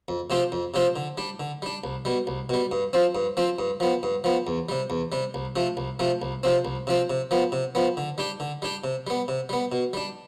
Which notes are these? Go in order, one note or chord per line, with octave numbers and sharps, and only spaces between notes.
F2
C3 F3 C4 G4
F2
C3 F3 C4 G4
D3
G3 D4
D3
G3 D4
C2
B2 G3
C2
B2 G3
G2
F3 C4
G2
F3 C4
G2
F3 B3
G2
F3 B3
E2
C3 G3
E2
C3 G3
C2
C3 F3 A3
C2
C3 F3 A3
C2
C3 F3 C4
C2
C3 F3 C4
C3
F3 B3
C3
F3 B3
D3
G3 D4 G4
D3
G3 D4 G4
C3
G3 B3
C3
G3 B3
B2
G3 D4